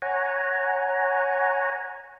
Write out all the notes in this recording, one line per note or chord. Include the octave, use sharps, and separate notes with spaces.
C#5 F#5 G#5 A#5